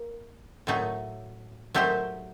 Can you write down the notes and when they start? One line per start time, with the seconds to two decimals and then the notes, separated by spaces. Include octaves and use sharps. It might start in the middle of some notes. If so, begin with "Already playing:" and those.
Already playing: A#3
0.67 A2 F#3 A3 D#4
1.74 F#3 A3 D#4 G4 C5